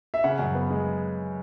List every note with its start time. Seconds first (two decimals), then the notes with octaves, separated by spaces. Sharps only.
0.14 E5
0.24 C#3 F#5
0.39 F#2
0.55 B3
0.71 G#3